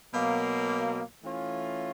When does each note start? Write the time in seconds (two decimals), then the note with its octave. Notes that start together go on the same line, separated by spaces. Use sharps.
0.14 B2 F#3 A#3
1.23 E3 A3 C#4 F4